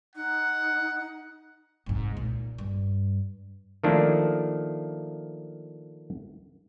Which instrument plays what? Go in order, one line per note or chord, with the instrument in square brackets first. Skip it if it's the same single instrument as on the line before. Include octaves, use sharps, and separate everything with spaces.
[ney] D#4 [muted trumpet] F#5
[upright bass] C2 G#2
A#2
G2
[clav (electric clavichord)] D#3 F3 A3 A#3 D4 E4